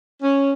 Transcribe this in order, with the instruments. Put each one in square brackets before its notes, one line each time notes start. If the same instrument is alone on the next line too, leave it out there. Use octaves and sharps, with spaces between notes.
[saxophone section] C#4